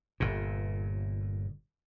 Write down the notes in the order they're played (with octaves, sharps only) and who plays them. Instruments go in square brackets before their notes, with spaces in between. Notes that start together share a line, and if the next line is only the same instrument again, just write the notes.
[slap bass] G1 A#2